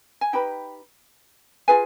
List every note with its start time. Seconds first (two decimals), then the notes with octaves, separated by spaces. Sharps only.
0.21 G#5
0.33 D#4 G4 B4 G5 B5
1.68 F4 G#4 B4 F5 G#5